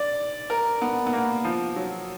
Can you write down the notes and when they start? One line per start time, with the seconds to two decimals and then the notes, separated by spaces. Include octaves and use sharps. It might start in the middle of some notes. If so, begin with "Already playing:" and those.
Already playing: D5
0.50 A#4
0.82 B3
1.07 B3
1.13 A#3
1.44 F3
1.76 F#3